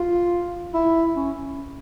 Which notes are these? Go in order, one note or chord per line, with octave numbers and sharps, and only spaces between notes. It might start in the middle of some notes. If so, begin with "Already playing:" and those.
Already playing: F4
E4
C#4